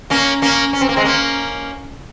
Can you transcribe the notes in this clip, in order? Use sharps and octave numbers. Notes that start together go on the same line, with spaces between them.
A#3 C#4
A#3 C#4
C#4
C4
A#3
G#3 C4
A#3 C#4